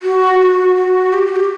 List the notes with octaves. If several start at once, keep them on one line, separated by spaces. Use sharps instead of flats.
F#4
F#4
F#4
G4
F#4
G4